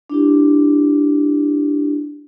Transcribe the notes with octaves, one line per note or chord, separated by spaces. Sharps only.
D4 E4 G4